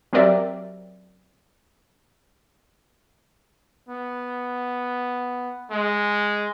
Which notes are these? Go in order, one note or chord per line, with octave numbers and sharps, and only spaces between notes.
F#3 C4 G4 A#4 D5 E5
B3
G#3